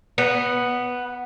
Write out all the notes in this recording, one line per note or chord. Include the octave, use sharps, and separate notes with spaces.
B3